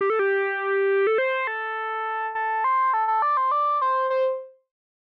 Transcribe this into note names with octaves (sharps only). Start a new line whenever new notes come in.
G4
A4
G4
A4
C5
A4
A4
C5
A4
A4
D5
C5
D5
C5
C5